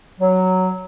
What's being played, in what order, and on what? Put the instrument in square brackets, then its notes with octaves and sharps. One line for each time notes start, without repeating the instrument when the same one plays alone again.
[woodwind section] F#3